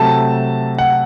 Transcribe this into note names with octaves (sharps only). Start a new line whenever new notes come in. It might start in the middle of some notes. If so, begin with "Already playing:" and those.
Already playing: C3 F#3 A3 A5
F#5